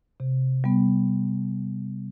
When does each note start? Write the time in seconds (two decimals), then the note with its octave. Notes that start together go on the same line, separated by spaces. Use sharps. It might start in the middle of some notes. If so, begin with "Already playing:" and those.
0.20 C3
0.64 G3 B3